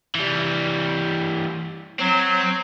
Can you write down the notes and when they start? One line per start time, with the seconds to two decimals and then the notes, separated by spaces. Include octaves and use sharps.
0.15 E3 G3
2.00 F#3 C4